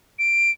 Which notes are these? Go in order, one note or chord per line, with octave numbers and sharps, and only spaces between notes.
D7